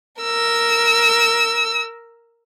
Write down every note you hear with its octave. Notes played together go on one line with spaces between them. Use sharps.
A#4 E6